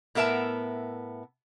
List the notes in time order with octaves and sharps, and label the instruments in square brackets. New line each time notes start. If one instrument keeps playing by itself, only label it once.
[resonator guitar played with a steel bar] A2 B3 A#4 E5 A5